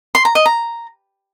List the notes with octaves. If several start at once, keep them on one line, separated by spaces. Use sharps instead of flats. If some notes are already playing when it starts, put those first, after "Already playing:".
C6
A#5
D#5
A#5